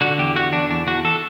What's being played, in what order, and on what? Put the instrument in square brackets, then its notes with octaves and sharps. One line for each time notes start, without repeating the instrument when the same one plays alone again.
[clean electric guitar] D3 F#4
E2 G4
D3 F#4
E2 D4
E2 D4
E2 F#4
A4